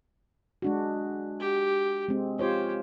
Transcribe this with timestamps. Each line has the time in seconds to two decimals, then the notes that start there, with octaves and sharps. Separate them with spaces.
0.62 G#3 D4 F#4
1.40 G4
2.09 G#3 C4
2.39 F4 G4 C5 C#5